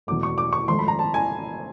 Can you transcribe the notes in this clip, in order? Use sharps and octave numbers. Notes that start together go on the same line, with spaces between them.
E1 E2 B2 F#3 A3 D6
C#6
D6
C#6
G#1 G#2 F3 A3 C6
B5
A#5
A5
G#5